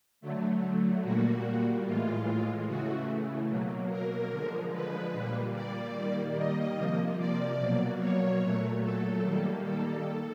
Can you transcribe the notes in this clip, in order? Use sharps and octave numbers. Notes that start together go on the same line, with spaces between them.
D3 F#3 A3
A#2 G3 A#3 F#4
A2 E3 G#3 F4
C#3 E3 A3 F#4
B2 F#3 A#3
A#4
D3 F3 G#3
B4
A#2 G3 A#3
D5
D#3 G3 A#3
D#5
C3 F3 A#3
D5
B2 F#3 A#3
C#5
A#2 F#3 A3
A4
D#3 G3 A#3
A4